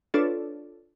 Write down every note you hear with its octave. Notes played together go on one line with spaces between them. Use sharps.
D4 F4 A4 B4 C#5 D5